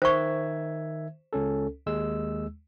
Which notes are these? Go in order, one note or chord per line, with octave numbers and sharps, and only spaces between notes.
D#3 C5 E5 C#6 G#6
C#2 C#4 A4
D#2 G#3 E6